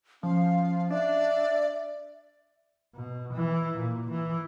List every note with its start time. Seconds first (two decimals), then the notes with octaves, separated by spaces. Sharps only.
0.23 F3 C#4 F5
0.90 D4 D5 E5
2.95 B2
3.33 E3
3.79 A#2
4.11 E3